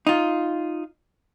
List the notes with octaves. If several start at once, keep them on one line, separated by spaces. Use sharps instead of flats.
D#4 F4